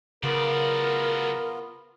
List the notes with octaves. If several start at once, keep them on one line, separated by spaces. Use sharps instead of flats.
C#3 F#3 B3 F4 A#4 D5